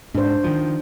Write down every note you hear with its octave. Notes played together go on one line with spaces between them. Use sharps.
G#2 D4 C5
D#3 F3